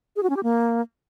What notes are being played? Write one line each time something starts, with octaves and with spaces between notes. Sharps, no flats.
G#4
F#4
C#4
G4
A#3